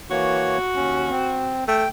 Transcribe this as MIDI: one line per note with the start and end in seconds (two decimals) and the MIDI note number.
0.11 0.58 52
0.11 0.58 58
0.11 1.57 66
0.11 0.58 73
0.75 1.10 39
0.75 1.10 61
1.11 1.64 60
1.68 1.85 57
1.68 1.89 79